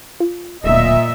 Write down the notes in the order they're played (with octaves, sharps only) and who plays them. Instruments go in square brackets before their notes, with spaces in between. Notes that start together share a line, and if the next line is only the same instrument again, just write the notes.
[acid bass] F4
[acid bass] D1 [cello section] A#2 D#5 E5